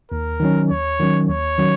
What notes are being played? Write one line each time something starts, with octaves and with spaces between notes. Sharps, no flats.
D#2 A#4
D#3 F#3 C#4
D#2 C#5
D#3 F#3 C#4
D#2 C#5
D#3 F#3 C#4